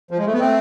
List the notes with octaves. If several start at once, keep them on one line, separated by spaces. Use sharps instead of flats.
F3
G#3
A3
B3
A3 C4